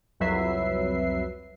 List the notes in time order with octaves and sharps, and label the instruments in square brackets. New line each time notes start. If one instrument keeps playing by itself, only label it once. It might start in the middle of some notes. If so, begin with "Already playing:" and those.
[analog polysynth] C2 F2 F#3 B4 E5 C7